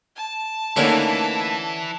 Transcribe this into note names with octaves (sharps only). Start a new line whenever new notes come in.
A5
D3 E3 A3 A#3 C#4 D#4